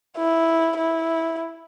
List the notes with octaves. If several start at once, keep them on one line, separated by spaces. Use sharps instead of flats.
E4
E4